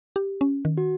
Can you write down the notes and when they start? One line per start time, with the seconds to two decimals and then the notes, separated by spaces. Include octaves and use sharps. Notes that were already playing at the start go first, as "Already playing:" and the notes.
0.16 G4
0.41 C#4
0.65 D#3
0.77 F#4